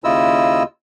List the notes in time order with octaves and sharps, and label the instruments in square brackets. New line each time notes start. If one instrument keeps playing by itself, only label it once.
[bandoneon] D#2 C#3 E4 F4 D#5 E6